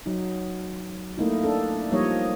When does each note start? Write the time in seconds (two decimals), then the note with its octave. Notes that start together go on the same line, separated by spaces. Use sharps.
0.06 F#3 D#4
1.18 A3 A#3 D#4 E4
1.44 D4 A4
1.92 F3 G3 A#3 D#4 C#5 D#5